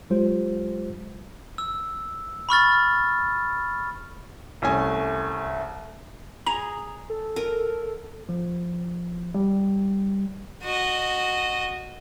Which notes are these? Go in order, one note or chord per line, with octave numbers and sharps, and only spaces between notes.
F#3 G#3 F4 G4 C5
E6
B5 C#6 F6 A6
C2 A3 C#4 G#5
G#4 A#5
A4
A#4
F3
G3
F#4 D#5